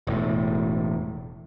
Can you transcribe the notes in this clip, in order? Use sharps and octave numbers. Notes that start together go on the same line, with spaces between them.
E1 A2